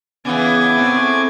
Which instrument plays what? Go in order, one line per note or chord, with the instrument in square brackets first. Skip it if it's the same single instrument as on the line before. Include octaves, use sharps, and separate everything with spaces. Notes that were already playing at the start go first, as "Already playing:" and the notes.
[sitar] C#3 E3 [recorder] B3 [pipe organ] G#5 D6 G#6
[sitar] A2 [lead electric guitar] C4